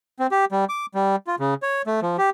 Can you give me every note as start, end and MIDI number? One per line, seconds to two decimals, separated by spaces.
0.20 0.27 60
0.31 0.45 67
0.52 0.65 55
0.69 0.86 86
0.95 1.16 55
1.27 1.35 65
1.40 1.54 49
1.63 1.82 73
1.87 2.00 57
2.02 2.17 53
2.18 2.30 67